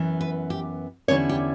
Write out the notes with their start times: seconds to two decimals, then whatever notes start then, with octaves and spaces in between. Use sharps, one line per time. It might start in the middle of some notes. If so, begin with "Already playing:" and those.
Already playing: F#2 E3 B3
0.21 B4
0.50 G4
1.08 E2 D3 G3 C#4 E4 C#5
1.29 G4